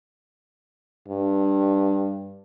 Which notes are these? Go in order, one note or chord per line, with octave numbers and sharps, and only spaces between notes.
G2